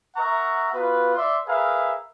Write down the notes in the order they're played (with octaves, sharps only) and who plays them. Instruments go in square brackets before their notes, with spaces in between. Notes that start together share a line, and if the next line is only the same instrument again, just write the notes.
[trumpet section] A#4 E5 F#5 A#5 C#6
B3 F4 F#4 B4
D5 E5 C6
G#4 A#4 B4 E5 F5